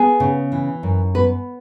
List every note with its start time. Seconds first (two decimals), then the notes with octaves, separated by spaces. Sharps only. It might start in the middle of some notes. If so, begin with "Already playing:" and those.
Already playing: B3 G#4
0.20 C#3
0.52 E3
0.83 F#2
1.15 B3 B4